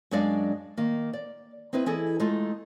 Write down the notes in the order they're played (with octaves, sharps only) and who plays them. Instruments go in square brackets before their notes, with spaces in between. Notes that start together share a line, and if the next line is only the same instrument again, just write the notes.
[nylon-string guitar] F#2 F#3 G#3 D4 D5 F5
D#3 A#3
D5
C4 D#4 E4 B4
E3 E4 G#4 A4 D#5
G#3 A3 D#4 F4 A4